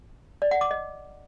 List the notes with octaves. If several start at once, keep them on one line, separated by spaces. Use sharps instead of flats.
D5
F#5
D6
D#5